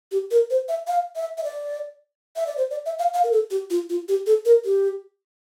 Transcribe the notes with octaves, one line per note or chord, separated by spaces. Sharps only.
G4
A#4
C5
E5
F5
E5
E5
D5
E5
D5
C5
D5
E5
F5
F5
A#4
A4
G4
F4
F4
G4
A4
A#4
G4